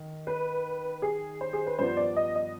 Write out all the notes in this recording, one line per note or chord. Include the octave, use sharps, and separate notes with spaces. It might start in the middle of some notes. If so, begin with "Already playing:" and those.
Already playing: D#3
B4
G#4
C5
G#4
B4
G2 F3 B3 D4 C5
D5
D#5
D#5